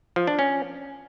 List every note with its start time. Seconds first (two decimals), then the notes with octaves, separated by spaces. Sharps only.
0.16 F3
0.27 D4
0.39 C#4